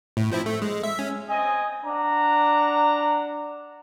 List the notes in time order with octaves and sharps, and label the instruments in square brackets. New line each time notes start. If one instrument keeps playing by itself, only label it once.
[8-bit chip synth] A2
F3 C4 E4
A3
G#3
E5
C#4
[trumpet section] C4 D#5 [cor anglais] G#5
[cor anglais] D4 [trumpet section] F#5 A#5